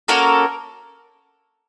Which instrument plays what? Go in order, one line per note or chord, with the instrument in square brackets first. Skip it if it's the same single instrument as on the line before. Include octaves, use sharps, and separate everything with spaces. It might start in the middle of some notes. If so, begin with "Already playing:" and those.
[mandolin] A#3 C#4 F#4 A4 A#4